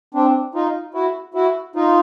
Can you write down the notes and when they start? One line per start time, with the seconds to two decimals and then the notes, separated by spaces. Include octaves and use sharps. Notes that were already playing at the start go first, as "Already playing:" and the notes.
0.14 C4 D4
0.55 D#4 F4
0.94 E4 F#4
1.34 E4 F#4
1.76 D#4 F4